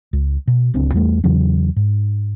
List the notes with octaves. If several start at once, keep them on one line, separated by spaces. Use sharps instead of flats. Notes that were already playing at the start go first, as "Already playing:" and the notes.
C#2
B2
D1 C#2 C4 D4
E2 G2 G3 A3
E2 C#3 E3 F#3
G#2